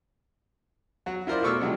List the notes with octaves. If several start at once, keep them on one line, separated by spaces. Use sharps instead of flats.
F#3 F#4
E4 F4 A#4 C5 D5
B2 A3 C#6 D6 E6 F6
C3 F3 F#3 G#3 D4